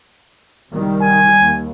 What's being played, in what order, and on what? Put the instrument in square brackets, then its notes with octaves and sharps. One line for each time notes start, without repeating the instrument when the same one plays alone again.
[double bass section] C2 D#3 G3
[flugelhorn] G#5
[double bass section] D#2